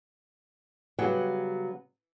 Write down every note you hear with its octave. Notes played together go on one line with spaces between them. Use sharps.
C#3 F#3 G3 B3 C#5 G5